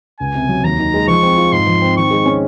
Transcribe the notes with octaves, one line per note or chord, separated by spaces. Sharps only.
C#2 G#5
C3
F#3
D#2 A#5
D#3
G#3
F3 C#6
C4
F4
G#2 C6
F3
C4
D#3 C#6
G#3
C#4